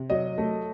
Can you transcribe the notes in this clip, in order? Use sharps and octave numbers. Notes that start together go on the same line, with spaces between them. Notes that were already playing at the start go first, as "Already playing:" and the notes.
Already playing: C3
F#3 D#5
A3